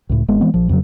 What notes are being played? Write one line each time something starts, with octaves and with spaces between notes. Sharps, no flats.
C#2 A2
G#1 G#3 B3
E3 G#3 B3 C4
A#1 F3
F2 C#3 E3 F#3